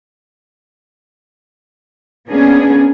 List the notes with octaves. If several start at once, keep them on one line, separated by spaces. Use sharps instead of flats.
A#3 B3 C#4 D4 G#4